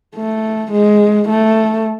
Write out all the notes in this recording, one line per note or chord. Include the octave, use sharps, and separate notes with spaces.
A3
G#3
A3